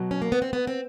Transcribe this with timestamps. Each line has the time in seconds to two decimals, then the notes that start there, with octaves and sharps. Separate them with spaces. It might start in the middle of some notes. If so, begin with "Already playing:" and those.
Already playing: B2 F#3
0.11 C#4
0.22 A#3
0.32 B3
0.42 C4
0.53 B3
0.67 C4